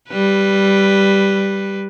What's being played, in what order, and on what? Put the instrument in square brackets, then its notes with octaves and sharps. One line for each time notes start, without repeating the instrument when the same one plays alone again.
[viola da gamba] G3 B4